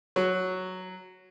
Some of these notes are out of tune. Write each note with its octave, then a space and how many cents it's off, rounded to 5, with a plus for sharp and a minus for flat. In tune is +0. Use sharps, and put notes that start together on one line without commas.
F#3 +0